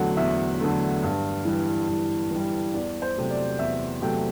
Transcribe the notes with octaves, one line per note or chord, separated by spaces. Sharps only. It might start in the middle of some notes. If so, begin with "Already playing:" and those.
Already playing: E2 D3 F#3 A3 F#5
E2 E5
D3 F#3 A3
G2
E3 G3
G2
E3 G3
E2 D5
C5
C3 F#3 A3
D5
E2 E5
C3 F#3 A3 G5